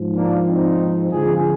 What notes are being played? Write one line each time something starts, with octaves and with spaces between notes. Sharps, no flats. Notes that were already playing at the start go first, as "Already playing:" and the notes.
Already playing: G#2 F3
A#3 D4
C4 D#4
F2 D3 F3 F4 G#4